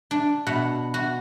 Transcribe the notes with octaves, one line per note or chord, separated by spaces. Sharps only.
D4
B2 F#5
F#4